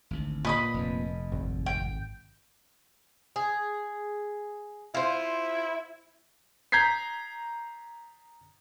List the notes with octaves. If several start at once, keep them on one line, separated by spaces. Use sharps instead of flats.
G#1 D2
A#2 B4 D#5 B5
F1 F2
G#1
G5
G#4
E4 F4 C5
A#5 G6 G#6 B6 C7